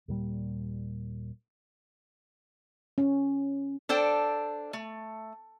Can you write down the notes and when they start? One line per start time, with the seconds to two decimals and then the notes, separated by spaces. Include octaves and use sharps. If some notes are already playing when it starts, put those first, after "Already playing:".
0.08 D#2 A#2 G3
2.98 C#4
3.89 D4 A4 C5 G5
4.73 A3